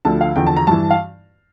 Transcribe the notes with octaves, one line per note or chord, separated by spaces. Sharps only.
D2 D3 F3 A5
F5
E2 D3 F3 G5
A5
A#5
G2 E3 A5
F5